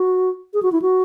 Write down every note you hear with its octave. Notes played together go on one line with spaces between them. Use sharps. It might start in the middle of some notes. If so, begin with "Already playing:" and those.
Already playing: F#4
G#4
F#4
E4
F#4